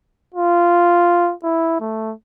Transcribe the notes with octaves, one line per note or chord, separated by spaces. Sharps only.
F4
E4
A3